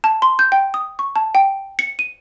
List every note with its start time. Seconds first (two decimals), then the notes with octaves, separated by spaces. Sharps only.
0.04 A5
0.22 C6
0.39 G6
0.52 G5
0.74 D#6
0.99 C#6
1.16 A5
1.35 G5
1.79 C#7
1.99 D#7